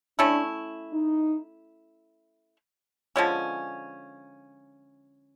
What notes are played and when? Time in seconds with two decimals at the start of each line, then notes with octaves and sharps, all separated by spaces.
0.19 A3 C#4 D4 E4
0.93 D#4
3.16 D3 F3 G#3 C#4